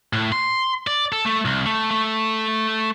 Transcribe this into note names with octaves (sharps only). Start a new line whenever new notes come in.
A2
C6
D5
A4
A3
C2
A3
A3